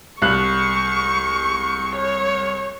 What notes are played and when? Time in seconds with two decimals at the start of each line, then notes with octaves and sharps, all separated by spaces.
0.22 C2 C#6 F#6
1.96 C#5